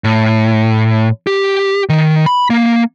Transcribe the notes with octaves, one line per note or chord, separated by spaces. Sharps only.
A2
G4
D#3
B5
A#3